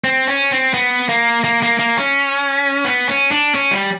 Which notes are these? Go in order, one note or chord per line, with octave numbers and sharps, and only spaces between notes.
C4
C#4
C4
B3
A#3
A#3
A#3
A#3
C#4
B3
C#4
D4
C#4
G3